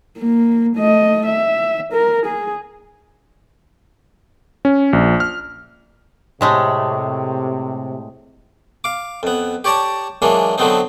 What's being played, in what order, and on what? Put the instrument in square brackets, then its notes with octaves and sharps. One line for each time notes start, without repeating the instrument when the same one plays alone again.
[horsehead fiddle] A#3
A3 D#5
E5
A#4
G#4
[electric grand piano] C#4
A#1
F6
[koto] A2 G#3 A3 [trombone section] C3
[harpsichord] F5 D6
F2 B3
G4 C#5 D5 A5 A#5
E3 F#3 G#3 A#3 D4
D3 F3 F#3 B3 C4 D#4